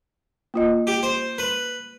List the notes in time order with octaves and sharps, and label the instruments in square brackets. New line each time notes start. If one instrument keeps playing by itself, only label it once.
[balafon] A#3 F4 D#5
[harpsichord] G4
C5
B4